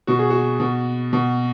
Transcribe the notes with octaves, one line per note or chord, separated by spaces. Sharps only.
B2 F#4
G#4
F#4
B2
B2